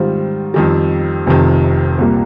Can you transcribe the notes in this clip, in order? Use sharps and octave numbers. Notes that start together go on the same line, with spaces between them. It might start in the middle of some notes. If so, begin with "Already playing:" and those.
Already playing: G#2 D#3 G3 C4 F4
F2 D#3 G3
F1 F2 C3 D#3
C2 A#2 G3 A#3